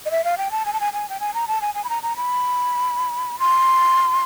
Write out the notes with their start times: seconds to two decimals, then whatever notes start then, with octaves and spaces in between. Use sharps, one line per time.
0.06 D#5
0.11 E5
0.25 F5
0.38 G5
0.51 A5
0.66 G#5
0.73 A5
0.80 G#5
0.93 G#5
1.09 G5
1.20 G#5
1.34 A#5
1.48 A5
1.61 G#5
1.75 G#5
1.84 B5
1.89 A#5
2.03 A#5
2.17 B5
3.39 C6